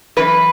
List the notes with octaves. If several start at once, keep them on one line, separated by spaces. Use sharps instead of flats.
F#2 E3 B4